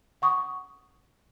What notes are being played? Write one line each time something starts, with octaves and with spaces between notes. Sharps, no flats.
F#5 C#6 D#6